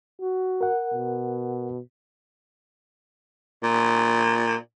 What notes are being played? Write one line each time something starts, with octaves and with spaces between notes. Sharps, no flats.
F#4
A#4 F#5
B2
A#2